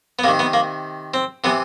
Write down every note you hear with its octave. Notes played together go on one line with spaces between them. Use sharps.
B3
C3 D#3 A#3
B3
A#3
C4
C3 E3 B3